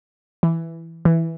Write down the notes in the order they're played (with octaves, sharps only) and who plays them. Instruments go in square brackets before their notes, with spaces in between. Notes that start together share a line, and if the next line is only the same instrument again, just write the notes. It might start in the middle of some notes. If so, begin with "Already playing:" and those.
[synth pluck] E3
E3